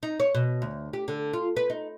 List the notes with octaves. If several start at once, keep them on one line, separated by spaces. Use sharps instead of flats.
D#4
C#5
B2
D2
G4
D3
F4
B4
D#4